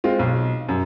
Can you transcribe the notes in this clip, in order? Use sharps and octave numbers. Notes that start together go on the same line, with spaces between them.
G#3 C4 F4
B1
F#2